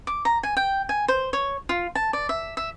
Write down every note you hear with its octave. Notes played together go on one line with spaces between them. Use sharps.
D6
A#5
G#5
G5
G#5
C5
C#5
F4
A5
D5
E5
E5